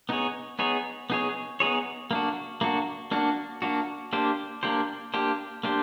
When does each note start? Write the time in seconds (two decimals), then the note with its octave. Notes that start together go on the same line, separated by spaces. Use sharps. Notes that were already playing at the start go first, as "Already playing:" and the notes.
0.09 B3 D#4 G#4 C#5
0.59 B3 D#4 G#4 C#5
1.10 B3 D#4 G#4 C#5
1.60 B3 D#4 G#4 C#5
2.11 A#3 D4 F#4
2.61 A#3 D4 F#4
3.11 A#3 D4 F#4
3.62 A#3 D4 F#4
4.13 A#3 D4 G4 C5
4.63 A#3 D4 G4 C5
5.14 A#3 D4 G4 C5
5.63 A#3 D4 G4 C5